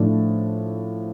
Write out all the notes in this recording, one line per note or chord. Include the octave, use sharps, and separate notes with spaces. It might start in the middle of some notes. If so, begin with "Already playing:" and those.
Already playing: A2 F3 A3 D4